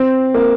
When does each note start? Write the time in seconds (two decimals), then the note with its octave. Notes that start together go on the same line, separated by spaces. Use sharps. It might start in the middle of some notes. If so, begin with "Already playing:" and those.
Already playing: C4
0.34 A#3